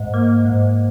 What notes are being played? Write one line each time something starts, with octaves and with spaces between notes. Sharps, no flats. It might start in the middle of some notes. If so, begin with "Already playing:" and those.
Already playing: G#2
A#3
G#2